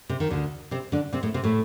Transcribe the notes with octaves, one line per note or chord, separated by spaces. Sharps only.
C3
D#3
D2 D3
C3 C4
D3 D4
C3 C4
A2 A3
C3 C4
A2 A3